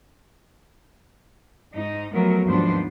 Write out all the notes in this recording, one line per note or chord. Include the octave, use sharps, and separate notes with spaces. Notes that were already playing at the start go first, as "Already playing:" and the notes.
G#2 D#4
F3 F#3 A3 B3 A#4
D#2 G#2 F3 B3 D4 C5